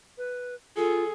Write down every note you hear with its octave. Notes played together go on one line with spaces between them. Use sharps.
B4
F4 G#4 A4